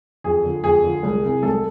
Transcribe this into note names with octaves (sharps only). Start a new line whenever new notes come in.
F2 G#4
D3 F3
F2 G#4
D3 F3
C2
C3 E3
C2 A4